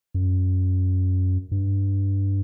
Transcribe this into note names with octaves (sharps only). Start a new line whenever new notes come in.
F#2
G2